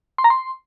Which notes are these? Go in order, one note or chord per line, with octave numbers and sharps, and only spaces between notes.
C6
A#5
C6